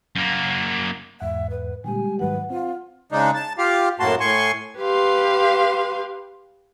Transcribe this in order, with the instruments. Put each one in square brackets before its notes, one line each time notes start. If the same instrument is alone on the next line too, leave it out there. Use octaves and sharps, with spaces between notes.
[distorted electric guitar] F#2 A#3
[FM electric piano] E2 G#2 F#5 [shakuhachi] E5
[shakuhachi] B4
[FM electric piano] A#2 D3 [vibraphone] G3 G#3 G4 [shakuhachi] G#5
[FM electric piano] G#2 D#3 F#3 [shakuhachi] B4 [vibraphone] F#5
[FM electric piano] C4 [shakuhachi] F4
[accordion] C#3 G#3 D4 D#4
A5
F4 G4 F5
F#2 A2 A#3 F#4 A5 C6
A2 G#5 C6 C#6
[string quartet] G4 B4 F5 C6